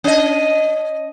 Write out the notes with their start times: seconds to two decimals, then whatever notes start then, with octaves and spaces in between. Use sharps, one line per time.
0.04 C#4 D#5